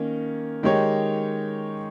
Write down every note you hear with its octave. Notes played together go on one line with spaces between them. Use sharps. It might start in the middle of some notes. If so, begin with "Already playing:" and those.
Already playing: D#3 A#3 C#4
D#3 G#3 D#4 G4 C#5